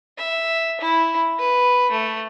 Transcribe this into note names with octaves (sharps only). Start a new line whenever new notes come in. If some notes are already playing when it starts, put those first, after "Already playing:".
E5
E4
B4
A3